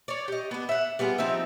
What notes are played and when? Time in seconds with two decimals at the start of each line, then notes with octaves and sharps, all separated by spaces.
0.08 C#5 D5
0.28 G4 D#5
0.51 B3 D4
0.69 E5 F#5
0.99 G3 B3 F4 G#4
1.18 F3 C4 D#4 E5